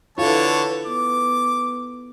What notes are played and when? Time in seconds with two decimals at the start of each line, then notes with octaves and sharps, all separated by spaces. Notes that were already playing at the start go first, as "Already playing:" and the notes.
0.18 D3 E4 F4 A4 B4 C#5 A5
0.86 B3 D6